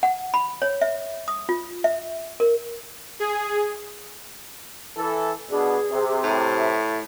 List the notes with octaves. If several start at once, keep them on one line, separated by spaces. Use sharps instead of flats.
F#5
B5
C#5
E5
D#6
F4
E5
A#4
G#4
E3 A4
B2 B3 D4 G#4
C3
A2
E5